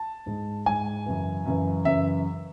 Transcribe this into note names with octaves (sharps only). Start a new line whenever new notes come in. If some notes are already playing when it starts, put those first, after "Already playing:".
Already playing: A5
G#2 G#3
G#2 G#3 G#5
F#2 C#3 E3
F#2 C#3 E3
F#2 C#3 E3 E5